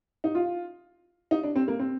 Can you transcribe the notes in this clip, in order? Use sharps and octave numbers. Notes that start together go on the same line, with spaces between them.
D#4
F4
D#4
D4
C4
A#3
C4